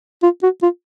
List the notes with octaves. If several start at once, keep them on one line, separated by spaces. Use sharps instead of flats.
F4
F#4
F4